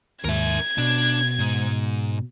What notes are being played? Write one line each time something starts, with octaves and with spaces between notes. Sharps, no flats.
D#2 G#2 A#4 E5 G#6
B2 D4
G#2